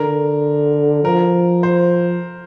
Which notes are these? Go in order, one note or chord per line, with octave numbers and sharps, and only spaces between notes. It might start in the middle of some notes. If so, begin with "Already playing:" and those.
Already playing: D3 A#4
F3 A#4
C5